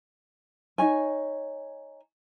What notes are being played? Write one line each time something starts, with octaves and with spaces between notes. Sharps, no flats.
D#4 G#4 C#5 G#5